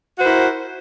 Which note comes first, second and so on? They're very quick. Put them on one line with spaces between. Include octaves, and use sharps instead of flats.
F#4 C5 A#4 E4